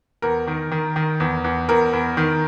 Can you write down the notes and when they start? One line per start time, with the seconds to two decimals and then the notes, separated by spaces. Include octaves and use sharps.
0.22 E2 A#4
0.47 D#3
0.72 D#3
0.96 D#3
1.20 E2
1.44 E2
1.69 E2 A#4
1.93 E2
2.17 D#3